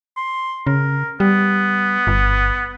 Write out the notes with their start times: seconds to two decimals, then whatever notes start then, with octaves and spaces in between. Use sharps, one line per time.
0.17 C6
0.67 C#3 A#4
1.20 G3 B3
2.07 G1